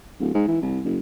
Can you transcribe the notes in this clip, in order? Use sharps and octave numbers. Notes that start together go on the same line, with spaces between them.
D1
G#2
E3
C2
F#1